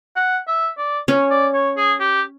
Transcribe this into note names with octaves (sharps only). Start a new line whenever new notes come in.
F#5
E5
D5
C#4 C#5
D5
C#5
G#4
G4